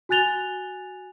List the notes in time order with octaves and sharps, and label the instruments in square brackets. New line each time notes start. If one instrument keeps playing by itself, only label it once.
[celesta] F#4 G#5 F#6 A6 F7 G7